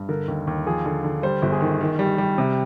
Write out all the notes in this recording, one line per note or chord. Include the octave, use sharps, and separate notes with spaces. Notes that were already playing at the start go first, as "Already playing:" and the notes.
Already playing: G2
D3 A#4
D#2
D#2
F3 G#4
D3
D3
G3 C5
G1
G#4
D#3
D#3
G3
G3
C3